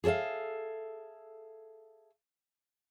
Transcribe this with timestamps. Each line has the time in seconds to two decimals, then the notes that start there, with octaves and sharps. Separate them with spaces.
0.04 G#4 A4 C#5 E5 F5